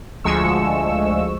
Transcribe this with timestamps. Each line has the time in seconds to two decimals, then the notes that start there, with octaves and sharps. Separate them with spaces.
0.24 D2 F3 G#3 C#6 E6